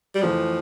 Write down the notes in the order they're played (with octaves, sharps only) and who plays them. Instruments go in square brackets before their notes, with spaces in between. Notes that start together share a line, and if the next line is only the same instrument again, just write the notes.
[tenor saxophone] G3
[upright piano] F2 E3 A3 [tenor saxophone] F3